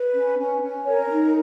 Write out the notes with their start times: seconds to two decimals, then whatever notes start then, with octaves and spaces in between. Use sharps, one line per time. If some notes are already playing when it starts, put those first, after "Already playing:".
Already playing: B4
0.14 C#4
0.38 C#4
0.62 C#4
0.86 A#4 C#5
1.10 D#4